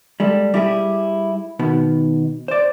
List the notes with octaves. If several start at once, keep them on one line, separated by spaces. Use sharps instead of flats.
G3 G#3 A4
G3 E4 G4 G#4
B2 D#3 B3
C5 D5